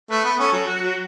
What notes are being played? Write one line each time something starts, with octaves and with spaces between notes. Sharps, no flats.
A3 B4
B3
C#4 A4
F#3
F#4
F#3